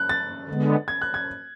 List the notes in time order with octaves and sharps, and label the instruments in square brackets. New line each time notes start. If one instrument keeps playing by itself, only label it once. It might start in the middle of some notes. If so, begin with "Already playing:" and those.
Already playing: [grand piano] F#6
A6
[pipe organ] D3 G#3 B3
[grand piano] G#6
F#6
G#6